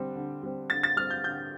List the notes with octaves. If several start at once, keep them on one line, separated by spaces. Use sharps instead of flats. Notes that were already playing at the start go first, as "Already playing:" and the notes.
Already playing: D3 G3 C4
D3
G3 C4
D3 A6
A6
G3 C4 F6
G6
D3 G6